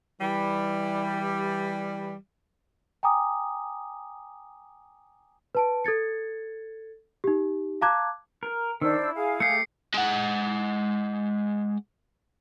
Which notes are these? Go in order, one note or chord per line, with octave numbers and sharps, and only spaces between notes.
E3 G3
G5 G#5 A#5 D6 D#6
B4 A5 D7
A4 G#6 A6 C#7
D#4 G4
F5 A5 A#5 D6 F#6 G#6
A#4
D#3 D4 C5 E6
E4
G#4 F5
A3 G4 C7 C#7
G#3 F#5